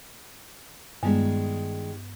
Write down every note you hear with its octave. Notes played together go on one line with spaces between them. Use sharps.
G2 D#3 G3 G#3 B3